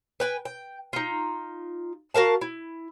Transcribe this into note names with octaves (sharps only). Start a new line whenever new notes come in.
B4 G5 G#5
G5
D#4 F4
F#4 A#4 F5 A5
E4